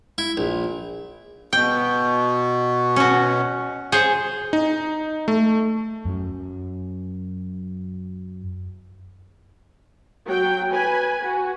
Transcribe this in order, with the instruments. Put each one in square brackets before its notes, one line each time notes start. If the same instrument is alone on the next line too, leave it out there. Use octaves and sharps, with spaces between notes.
[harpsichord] E4
A#1
[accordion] B2 [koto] G5
[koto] C#4 F#4
G#4 C5 C#5
[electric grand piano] D#4
A3
[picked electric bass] F#2 F#3
[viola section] F#3 G5
B4 G#5 B5
F#4